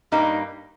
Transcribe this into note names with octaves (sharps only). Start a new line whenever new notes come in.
G2 G3 A#3 D#4